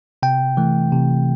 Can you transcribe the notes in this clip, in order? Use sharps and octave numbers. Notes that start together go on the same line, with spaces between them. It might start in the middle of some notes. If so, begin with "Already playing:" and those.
C3 G5
E3 A3
C3